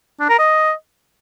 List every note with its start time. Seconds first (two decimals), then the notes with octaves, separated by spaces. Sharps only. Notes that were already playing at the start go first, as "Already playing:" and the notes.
0.20 D4
0.29 A#4
0.39 D#5